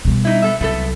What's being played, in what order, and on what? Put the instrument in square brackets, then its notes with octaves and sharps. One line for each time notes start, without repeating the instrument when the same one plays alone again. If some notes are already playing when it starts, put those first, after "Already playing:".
[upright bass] B2 G3
[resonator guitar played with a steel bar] D#4 E4
B3 A4 E5
[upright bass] C2 F#3 [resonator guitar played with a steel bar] A3 B3 A4